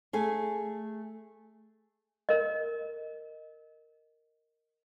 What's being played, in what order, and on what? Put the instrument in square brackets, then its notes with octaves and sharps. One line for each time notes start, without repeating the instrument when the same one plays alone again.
[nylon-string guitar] A3 G#4 G#5
[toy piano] A#4 D#5